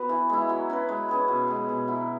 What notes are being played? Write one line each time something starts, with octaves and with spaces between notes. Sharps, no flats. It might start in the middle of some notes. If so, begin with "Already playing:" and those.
Already playing: B3 F#4 B4
E3
G#3 E4
F#3
C#4 F#4 B4
G#3
C#4 G#4 B4
B2
G#3 B3
B2
F#3 E4